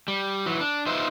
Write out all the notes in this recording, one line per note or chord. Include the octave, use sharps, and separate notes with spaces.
G3
E3 F#3
D4
D#4 F4 B4 C5 E5